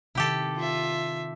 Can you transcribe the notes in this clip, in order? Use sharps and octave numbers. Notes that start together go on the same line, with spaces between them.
C3 D#3 E4 G4 A4
F4 E5